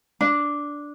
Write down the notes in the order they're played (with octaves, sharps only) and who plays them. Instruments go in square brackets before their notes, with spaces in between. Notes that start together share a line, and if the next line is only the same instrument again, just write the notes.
[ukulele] D4